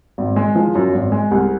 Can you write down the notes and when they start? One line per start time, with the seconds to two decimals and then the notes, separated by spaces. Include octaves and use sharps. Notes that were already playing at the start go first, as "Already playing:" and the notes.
0.18 G#1
0.36 G#3
0.55 F3
0.75 F#2
0.93 G#1
1.12 G#3
1.31 C2